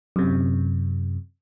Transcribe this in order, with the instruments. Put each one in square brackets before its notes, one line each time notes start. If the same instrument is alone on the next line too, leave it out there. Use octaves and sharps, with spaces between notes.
[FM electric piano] F#2 C3